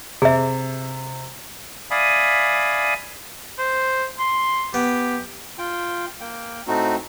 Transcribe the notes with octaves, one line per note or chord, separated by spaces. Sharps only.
C3 G#4 E5
D5 E5 F5 G#5 B5 D#6
C5
C6
B3 G4
F4 G5
A#3 G5
A2 A3 C4 D#4 F#4